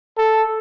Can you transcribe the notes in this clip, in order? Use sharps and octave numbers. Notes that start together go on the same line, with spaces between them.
A4